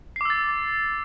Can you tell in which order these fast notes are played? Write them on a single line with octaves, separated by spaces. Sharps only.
C7 D6 E6 A6